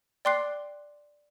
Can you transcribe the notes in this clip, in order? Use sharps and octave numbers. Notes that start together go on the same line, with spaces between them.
D5 G5 C6 D6 F#6 C7